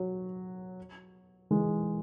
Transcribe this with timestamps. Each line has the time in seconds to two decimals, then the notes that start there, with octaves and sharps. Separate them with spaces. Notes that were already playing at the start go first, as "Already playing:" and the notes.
Already playing: F#3
1.51 E3 G#3